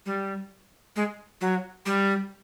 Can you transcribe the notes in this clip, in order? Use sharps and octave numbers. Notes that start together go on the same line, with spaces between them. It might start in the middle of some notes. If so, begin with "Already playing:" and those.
G3
G#3
F#3
G3